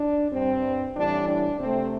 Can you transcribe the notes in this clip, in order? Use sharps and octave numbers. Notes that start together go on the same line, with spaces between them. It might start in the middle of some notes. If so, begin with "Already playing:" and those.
Already playing: D4
G2 G3 C4
A2 E3 G3 D4
D4
C3 A3 C4